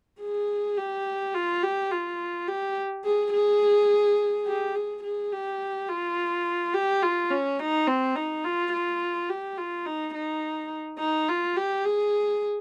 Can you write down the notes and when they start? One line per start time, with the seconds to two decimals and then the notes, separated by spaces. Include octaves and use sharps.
0.21 G#4
0.78 G4
1.34 F4
1.63 G4
1.91 F4
2.48 G4
3.05 G#4
3.33 G#4
4.47 G4
4.75 G#4
5.03 G#4
5.32 G4
5.89 F4
6.74 G4
7.02 F4
7.30 C#4
7.59 D#4
7.87 C4
8.16 D#4
8.44 F4
8.72 F4
9.29 G4
9.57 F4
9.86 D#4
10.14 D#4
10.99 D#4
11.28 F4
11.57 G4
11.85 G#4